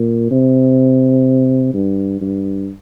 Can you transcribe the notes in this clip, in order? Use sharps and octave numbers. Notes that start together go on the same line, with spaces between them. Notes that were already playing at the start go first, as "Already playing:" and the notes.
Already playing: A#2
C3
G2
G2